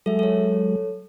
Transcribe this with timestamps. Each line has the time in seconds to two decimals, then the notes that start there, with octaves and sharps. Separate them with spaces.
0.06 F#3 G#3 A4 E5
0.19 A4 C#5